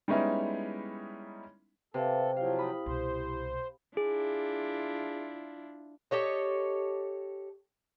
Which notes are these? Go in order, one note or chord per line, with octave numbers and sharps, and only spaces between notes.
G3 G#3 B3 C#4 D#4 E4
C3 A4 B4 E5 F5
F3 F#3 E4 G4 F5
B5 D#6
C2 B2 C5
D4 E4 F4 G#4
G4 A4 C#5 D#5